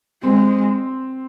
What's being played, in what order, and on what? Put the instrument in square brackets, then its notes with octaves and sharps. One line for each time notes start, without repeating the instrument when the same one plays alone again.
[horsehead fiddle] G#3 [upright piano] C4